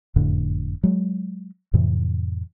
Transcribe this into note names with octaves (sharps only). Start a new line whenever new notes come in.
F#1 F2 A2 D3
F#3 G#3
F2 A2 C3 E3